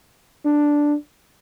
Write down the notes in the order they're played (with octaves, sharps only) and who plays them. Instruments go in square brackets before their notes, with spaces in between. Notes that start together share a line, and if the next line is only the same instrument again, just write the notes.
[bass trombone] D4